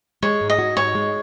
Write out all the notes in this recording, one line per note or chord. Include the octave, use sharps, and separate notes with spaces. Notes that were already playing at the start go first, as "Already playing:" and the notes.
G#3 C#5
G#2
D#5
F#4
G#2 C#5
G#3